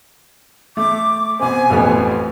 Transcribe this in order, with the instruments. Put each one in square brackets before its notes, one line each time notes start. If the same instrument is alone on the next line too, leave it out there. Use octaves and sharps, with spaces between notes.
[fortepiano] A3 [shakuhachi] D6
[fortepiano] B2 C4 [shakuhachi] G#5
[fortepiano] A1 F2 B3